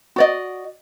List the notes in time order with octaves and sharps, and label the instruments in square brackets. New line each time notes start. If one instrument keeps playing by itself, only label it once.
[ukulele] F#4 D5 D#5